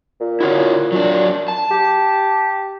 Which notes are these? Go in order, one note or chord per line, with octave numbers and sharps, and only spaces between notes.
A#2
E4 F#4 C#5
F#3 D4
A5
G4